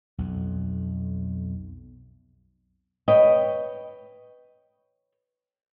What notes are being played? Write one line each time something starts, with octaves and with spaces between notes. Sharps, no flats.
B1 F2
B4 C#5 D#5 G5